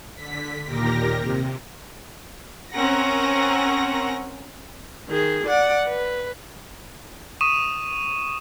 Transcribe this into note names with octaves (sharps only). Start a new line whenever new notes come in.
D3 B6
D#2 A#2 G4 A#4 A#6
C3
C4 C#4 A#4 F#5 A#6
D#3 G#4
D5 F#5
B4
C#6 D#6 D#7 E7